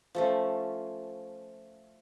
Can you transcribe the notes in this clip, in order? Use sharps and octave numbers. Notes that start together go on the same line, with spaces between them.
F3 A3 C#4